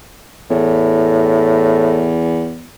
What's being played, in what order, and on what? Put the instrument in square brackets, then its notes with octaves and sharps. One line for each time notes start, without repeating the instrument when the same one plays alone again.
[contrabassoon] E2 [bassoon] A2